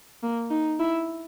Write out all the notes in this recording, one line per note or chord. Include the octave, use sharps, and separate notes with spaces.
A#3
D#4
E4